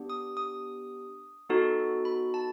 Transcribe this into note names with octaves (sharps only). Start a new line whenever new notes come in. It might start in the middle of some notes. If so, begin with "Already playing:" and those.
Already playing: B3 D4 G4
D#6
D#6
B3 D#4 F#4 A4
B5
A5